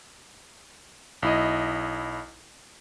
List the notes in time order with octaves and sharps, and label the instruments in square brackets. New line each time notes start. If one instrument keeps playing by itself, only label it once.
[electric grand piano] B1 E4 D#5